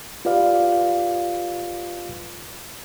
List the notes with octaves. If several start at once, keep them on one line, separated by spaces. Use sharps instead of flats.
F4 G4 B4 D5 F5